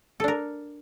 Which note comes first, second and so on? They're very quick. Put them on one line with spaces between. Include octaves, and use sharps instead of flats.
A4 D4 A#4